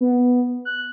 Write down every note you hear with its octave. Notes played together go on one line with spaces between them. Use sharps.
B3
F#6